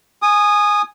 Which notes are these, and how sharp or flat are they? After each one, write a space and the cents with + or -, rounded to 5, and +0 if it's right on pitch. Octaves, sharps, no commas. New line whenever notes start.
G#5 +0 D#6 -15